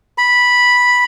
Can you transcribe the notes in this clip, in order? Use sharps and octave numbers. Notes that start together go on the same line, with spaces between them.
B5